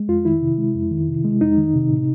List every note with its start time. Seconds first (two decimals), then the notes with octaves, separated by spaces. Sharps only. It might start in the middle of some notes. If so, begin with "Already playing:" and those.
Already playing: G#3
0.08 F2 F4
0.25 D#3 E4
0.41 C3
0.58 G#3
0.75 F2
0.91 D#3
1.08 C3
1.24 G#3
1.41 F2 D#4
1.57 D#3
1.74 C3
1.90 A2